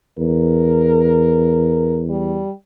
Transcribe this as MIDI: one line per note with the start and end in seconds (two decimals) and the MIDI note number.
0.18 2.41 40
0.18 2.02 70
2.09 2.51 55